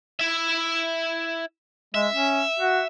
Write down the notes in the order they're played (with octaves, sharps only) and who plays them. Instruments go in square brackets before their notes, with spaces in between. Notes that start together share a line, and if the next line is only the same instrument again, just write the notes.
[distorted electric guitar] E4 E5
[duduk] G#3 [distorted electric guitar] E5
[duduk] C#4
F#4